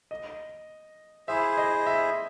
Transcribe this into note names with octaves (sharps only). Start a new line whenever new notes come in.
D#5
E4 G#4 C5 E5
D#5
E5